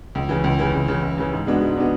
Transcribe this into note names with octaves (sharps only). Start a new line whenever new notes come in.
C#2
C#3 E3
C#2
C#3 E3
C#2
C#3 E3
C#2
C#3 E3
G#2
G#3 B3 D4 F#4
G#2
G#3 B3 D4 F#4